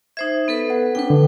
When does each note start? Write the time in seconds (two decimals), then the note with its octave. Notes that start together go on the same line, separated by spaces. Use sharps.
0.17 D#4 C5 E5 G#6
0.48 B3 A4 B4
0.70 F#5
0.95 C#4 D4 A4 B4 G5
1.10 D3